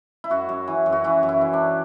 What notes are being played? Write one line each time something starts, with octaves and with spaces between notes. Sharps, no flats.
E4
F#2 F#4
F#2
E3
F#2
F#4
E3 E4
F#2
E4
E3
D4